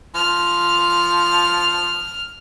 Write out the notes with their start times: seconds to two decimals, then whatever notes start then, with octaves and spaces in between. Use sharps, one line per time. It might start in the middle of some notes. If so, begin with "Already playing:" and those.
0.15 F3 F6